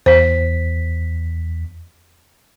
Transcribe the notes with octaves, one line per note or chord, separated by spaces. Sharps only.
E2 C5 B6